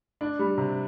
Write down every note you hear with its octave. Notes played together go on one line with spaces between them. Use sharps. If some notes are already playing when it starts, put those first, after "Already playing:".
D4
G3
C3